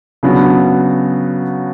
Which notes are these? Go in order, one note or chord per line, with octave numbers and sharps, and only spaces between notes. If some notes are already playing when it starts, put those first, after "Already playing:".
C#3 F#3 B3 D4 F#4